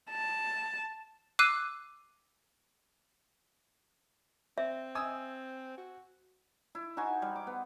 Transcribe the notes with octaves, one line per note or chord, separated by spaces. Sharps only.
A5
D6 E6 F#6 C7 D#7
C4 E5
G#5 D#6 E6
F#4
E4
D#4 F#4 C5 G#5
G3
D6
B3